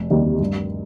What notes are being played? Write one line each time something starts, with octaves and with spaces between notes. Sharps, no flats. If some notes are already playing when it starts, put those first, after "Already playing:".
Already playing: F1
D#2 D#3 G3
G2